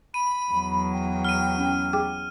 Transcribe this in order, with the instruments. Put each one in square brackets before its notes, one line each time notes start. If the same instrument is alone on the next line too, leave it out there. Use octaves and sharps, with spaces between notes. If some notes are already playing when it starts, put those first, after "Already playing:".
[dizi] B5 [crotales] D#7
[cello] E2 F#3
[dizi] G5
[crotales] F6 D#7
[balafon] C#4
G#4 G5 D6